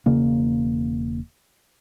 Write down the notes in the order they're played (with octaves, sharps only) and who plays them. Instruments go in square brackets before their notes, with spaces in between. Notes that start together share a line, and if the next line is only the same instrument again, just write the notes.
[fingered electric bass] E1 C#3 A#3